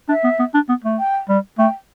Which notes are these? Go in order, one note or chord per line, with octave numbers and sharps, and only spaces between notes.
D4 E5
B3
B3
D4
B3
A3
G5
G3
A3 G5